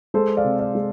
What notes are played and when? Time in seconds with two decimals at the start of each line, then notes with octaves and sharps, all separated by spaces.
0.14 G#3 A4 C5
0.37 D5 F5
0.44 C3
0.59 D5 F5
0.75 G#3